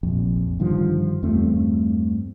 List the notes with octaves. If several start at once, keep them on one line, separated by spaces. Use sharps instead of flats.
F1 A#1 F2
G2 D3 D#3 F3
E2 G2 A3 C4